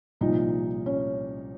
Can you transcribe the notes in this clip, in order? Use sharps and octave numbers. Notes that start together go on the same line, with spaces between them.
C2 A#2 F3 D#4
C#4